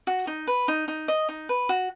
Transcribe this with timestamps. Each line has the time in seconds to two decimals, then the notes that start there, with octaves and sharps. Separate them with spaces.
0.07 F#4
0.27 D#4
0.47 B4
0.68 D#4
0.88 D#4
1.08 D#5
1.29 D#4
1.49 B4
1.69 F#4